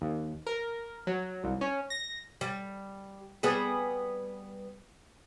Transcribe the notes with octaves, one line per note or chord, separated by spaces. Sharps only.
D#2
A#4
F#3
C2
C#4
A#6
G3
G3 B3 G#4